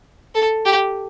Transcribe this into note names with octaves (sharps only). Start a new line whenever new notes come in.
A4
G4